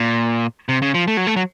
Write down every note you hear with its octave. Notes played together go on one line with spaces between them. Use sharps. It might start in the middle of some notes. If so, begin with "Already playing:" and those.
Already playing: A#2
C3
C#3
F3
A3
F#3
A3
F#3